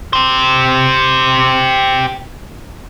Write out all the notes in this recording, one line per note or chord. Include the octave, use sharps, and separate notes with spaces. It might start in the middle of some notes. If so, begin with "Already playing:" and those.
G4 C5